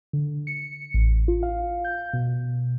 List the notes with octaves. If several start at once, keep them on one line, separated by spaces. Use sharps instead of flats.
D3
C#7
A1
F4
F5
G6
B2